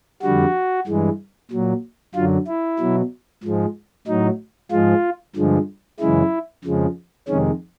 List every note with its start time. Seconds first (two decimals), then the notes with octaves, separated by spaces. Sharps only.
0.22 F2 D3 G3 F#4
0.87 G2 E3 G#3
1.51 A#2 F#3
2.15 F#2 D3 F#3 F4
2.47 E4
2.79 B2 F#3
3.43 G#2 F3 G#3
4.07 A2 F#3 D#4
4.71 G#2 F3 G#3 F4
5.36 G2 D3 F3 G#3
6.00 F#2 C#3 E3 G#3 E4
6.64 F2 C#3 F3 G#3
7.28 F2 C3 D#3 G#3 C#4